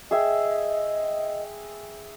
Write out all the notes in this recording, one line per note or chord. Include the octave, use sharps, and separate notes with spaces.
G#4 D#5 E5 G5